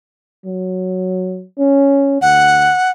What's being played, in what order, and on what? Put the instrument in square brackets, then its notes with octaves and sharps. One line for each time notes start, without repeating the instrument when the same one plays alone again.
[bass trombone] F#3
C#4
[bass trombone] D2 [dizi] F#5